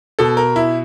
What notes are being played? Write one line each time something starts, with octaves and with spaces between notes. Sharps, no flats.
B2 A4
A#4
E4